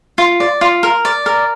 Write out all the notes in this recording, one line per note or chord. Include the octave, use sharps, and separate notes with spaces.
F4
D5
F4
A#4
D5
A#4